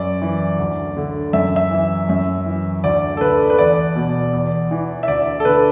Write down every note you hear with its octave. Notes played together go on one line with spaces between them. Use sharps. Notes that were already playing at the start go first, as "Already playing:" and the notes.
Already playing: F#2 D5
E3
D2
D3
F#2 E5
E5
E3
F#2
E3
D2 D5
A4
D3 B4
B4
E2 D5
B2
E2
E3
E5
D2 D5
A4
D3 B4